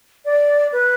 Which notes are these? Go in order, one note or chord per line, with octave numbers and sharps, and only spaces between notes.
D5
B4